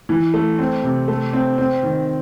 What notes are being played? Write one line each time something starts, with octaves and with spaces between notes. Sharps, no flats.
E3
A3
C4
C3
A3
C4
C4
D#3